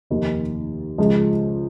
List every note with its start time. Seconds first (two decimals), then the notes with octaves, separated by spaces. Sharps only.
0.10 F1 D#2 D#3 A#3
0.98 C#2 C#3 F3